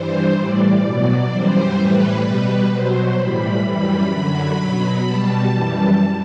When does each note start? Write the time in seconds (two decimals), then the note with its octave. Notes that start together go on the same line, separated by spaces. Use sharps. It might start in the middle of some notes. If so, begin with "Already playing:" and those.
Already playing: G2 E3 G3 C5
0.37 A2 E3 G3 D5
0.84 B2 F#3
1.31 F#2 E3 G3 C5
1.77 A2 E3 G3 B4
2.25 B2 G3 B4
2.71 B2 F#3 C5
3.18 A2 E3 G3 B5
3.65 F#2 E3 G3 B5
4.13 F#2 D3 F#3
4.60 B2 F#3
5.06 B2 G3 A5
5.53 F#2 E3 G3